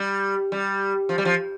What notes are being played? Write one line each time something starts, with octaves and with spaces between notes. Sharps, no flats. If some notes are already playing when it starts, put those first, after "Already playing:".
Already playing: G3
G3
F3
G3
F3